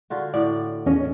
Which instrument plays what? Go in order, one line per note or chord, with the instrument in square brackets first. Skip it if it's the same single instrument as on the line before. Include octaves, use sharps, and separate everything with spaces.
[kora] D3 F4 F#4
[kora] A2 [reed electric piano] D5
[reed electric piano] E2 C#4 [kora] D#5